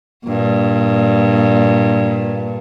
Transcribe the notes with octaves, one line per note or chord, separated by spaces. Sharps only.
G2 A#2